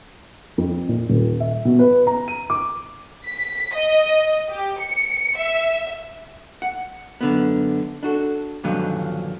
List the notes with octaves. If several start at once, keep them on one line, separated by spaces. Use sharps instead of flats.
F2
A#2
D#1
E5
B2
B4
A#5
D#7
D6
B6
D#5
G4
C#7
E5
F#5
F#2 D3 B3
D4 F#4 A4
G2 A#2 D3 D#3 F3 F#3